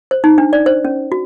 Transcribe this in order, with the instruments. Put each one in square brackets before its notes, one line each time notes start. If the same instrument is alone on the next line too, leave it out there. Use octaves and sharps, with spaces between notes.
[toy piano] C5
D#4
D4
D5
C5
C#4
F#4